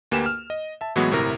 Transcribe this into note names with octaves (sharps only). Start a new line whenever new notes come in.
D2 A#3 G4 B4 G#5 E7
F6
D#5
E5 A5
A2 E3 F#3 G#3 B3 F#4
G1 A2 C3 E4 A#4 A#6